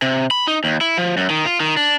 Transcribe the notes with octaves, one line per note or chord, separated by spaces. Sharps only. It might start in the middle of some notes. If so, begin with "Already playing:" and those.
C3
B5
D#4
D#2
E4
F3
F#2
D#3
F4
D#3
D4